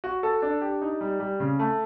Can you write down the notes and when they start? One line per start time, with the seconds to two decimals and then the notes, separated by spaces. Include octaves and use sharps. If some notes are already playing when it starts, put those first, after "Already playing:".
0.04 F#4
0.23 A4
0.42 D4
0.62 G4
0.82 D#4
1.01 G3
1.20 G3
1.40 C#3
1.59 A3